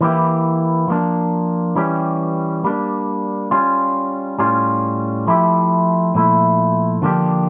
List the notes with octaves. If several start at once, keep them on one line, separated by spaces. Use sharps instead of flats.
E3 A#3 E4 G4
F3 A#3 D4
E3 G3 C#4 G4
G3 A#3 D4
G3 C#4 F4
A2 G3 C#4 F4
F3 A3 E4 G4
A#2 F3 A3 E4
D3 F3 A#3 D4 G4